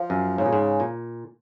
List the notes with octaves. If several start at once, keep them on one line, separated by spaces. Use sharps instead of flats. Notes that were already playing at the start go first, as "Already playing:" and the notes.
Already playing: F3
F#2
G#2 C#3
A#2
G#2
A#2